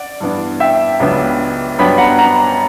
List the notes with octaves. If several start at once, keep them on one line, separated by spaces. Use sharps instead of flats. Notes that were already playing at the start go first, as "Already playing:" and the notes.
Already playing: D5 F#5
G2 E3 B3 D4
E5 G5
C#2 C#3 F#3 B3 D4
G2 F#3 B3 D4 G5 B5
F#5 A#5
F#5 A#5